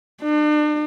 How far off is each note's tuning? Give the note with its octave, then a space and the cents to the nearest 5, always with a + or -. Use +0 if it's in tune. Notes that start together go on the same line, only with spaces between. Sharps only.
D4 +40